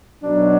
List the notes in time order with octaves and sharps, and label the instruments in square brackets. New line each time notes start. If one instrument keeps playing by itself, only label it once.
[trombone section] B1 B2 F#3 [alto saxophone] D4